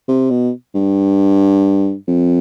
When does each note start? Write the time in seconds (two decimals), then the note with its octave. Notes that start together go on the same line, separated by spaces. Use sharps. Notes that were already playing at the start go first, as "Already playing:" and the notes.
0.08 C3
0.31 B2
0.75 G2
2.08 F2